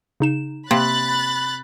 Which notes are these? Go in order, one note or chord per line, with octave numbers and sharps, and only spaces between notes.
C#3 D#4 E7
C3 A#3 B5 F#6 A6